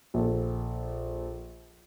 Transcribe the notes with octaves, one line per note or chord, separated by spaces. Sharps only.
A#1 A4